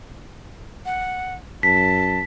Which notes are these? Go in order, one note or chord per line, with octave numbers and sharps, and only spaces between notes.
F#5
F#2 A5 B6